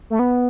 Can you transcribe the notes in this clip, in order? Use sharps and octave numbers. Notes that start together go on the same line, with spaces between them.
A3
B3